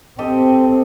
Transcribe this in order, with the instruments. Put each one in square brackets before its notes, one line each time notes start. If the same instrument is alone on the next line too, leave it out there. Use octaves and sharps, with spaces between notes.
[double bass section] C4 [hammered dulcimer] G4 A4 D#5